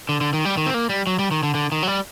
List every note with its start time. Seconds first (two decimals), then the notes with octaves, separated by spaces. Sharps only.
0.09 D3
0.21 D3
0.33 D#3
0.45 G3
0.57 D#3
0.66 C4
0.74 A#3
0.90 G3
1.07 F#3
1.19 G3
1.31 D#3
1.43 D3
1.55 D3
1.72 D#3
1.83 F#3
1.88 G3